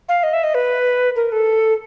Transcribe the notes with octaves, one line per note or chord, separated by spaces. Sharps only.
F5
D#5
E5
D#5
B4
A#4
A4